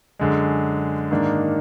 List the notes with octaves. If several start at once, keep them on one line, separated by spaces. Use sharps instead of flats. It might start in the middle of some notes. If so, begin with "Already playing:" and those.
F#2 D3 G#3
G#2 D#3 A#3 D4